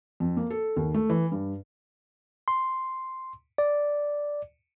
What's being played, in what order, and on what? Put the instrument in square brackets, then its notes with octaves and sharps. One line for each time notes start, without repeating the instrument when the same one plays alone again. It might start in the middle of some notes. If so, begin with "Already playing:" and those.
[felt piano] F2
A#3
A4
D#2
A3
E3
G2
[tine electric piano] C6
D5